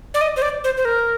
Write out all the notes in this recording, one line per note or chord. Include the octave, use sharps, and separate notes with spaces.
D5
D#5
C5
D5
C5
C5
A#4